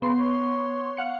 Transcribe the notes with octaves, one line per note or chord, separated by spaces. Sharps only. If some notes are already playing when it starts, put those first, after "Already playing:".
C#3 B3 C6
C#5
F5 F#5 C#7